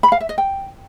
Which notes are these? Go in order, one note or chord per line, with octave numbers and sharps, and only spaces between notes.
B5
F5
E5
D#5
G5